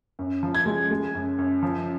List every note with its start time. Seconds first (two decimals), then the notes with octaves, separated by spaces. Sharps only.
0.19 F#2
0.43 F3
0.55 G#6
0.66 G#3
0.91 G#3
1.15 F#2
1.39 F#2
1.63 F3